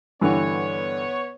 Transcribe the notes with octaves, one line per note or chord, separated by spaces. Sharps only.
G2 D3 E3 B3 C#5